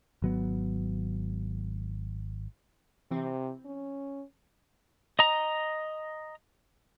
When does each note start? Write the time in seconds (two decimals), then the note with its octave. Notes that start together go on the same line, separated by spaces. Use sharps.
0.22 G#1 F#3 B3
3.11 C3 E3 C4
3.65 C#4
5.19 D#5 A#5